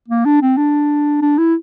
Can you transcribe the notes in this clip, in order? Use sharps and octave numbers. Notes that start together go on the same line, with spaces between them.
A#3
D4
C4
D4
D4
E4